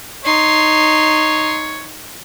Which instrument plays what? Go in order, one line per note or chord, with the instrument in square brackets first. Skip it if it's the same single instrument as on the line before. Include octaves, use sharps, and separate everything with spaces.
[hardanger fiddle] D#4 C6 [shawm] C#5